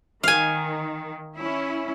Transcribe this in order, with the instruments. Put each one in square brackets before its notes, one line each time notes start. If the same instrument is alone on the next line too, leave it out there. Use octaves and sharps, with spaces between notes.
[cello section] D#3 [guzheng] F5 G#5
[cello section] C#4 E4